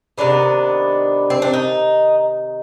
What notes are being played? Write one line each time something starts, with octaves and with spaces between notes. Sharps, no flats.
C3 D#3 B3 D4
C4
D4
D#4